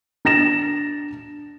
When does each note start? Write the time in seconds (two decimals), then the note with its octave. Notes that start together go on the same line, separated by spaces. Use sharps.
0.25 D4 A6 A#6 E7